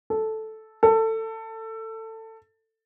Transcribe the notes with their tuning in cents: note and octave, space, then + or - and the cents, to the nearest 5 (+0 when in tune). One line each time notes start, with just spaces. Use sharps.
A4 -5
A4 +20